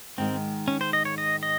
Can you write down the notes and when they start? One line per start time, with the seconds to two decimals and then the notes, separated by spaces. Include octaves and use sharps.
0.18 G#2 D#3 G#3 C4
0.68 C#4
0.81 C5
0.93 D#5
1.05 C#5
1.18 D#5
1.43 D#5